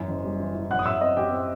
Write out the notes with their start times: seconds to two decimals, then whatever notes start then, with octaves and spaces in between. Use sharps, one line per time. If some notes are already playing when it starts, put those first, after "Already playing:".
Already playing: F#2 E3
0.08 F#1
0.24 G3
0.40 E3
0.55 E3
0.70 F#2 F#5 F#6
0.79 D#6
0.85 F#3 E5 E6
1.01 C4 D#5 D#6
1.17 F#2 G4 G5
1.31 C4